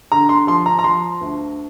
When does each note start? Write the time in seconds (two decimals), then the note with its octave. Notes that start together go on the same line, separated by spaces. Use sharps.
0.12 D3 A#5
0.29 C6
0.47 F3 C6
0.66 A#5
0.79 A#5
0.84 F3 C6
1.21 D2